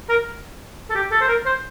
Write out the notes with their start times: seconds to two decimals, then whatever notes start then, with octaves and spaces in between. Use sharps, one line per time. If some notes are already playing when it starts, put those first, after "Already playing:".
0.09 A#4
0.90 A4
0.95 G4
1.12 A4
1.21 C5
1.28 A#4
1.46 C5